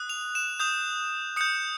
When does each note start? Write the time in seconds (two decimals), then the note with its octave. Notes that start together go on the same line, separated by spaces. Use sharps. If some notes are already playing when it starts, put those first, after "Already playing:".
Already playing: D#6 F#6
0.10 F7
0.35 E7
0.60 D#6 G6 F7
1.36 D#6 G6 C#7